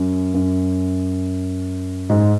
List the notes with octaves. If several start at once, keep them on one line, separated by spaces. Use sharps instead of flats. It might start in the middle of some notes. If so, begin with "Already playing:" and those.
Already playing: F#2
F#2
G#2